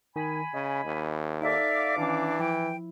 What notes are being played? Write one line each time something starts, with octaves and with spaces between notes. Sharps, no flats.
D#3 G#5 B5
C#3 D#5
D#2
D#4 A4 D5 E5 F5 D6
D#3 E3 C#4 D4
F3 E4 G5